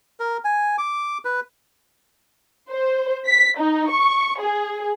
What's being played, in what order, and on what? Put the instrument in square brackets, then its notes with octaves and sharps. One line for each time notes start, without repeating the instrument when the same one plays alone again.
[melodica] A#4
G#5
D6
B4
[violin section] C5
B6
D#4
C#6
G#4